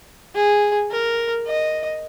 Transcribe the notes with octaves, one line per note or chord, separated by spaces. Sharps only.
G#4
A#4
D#5